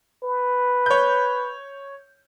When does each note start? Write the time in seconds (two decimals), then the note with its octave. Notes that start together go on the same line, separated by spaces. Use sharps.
0.23 B4
0.86 C#5 G6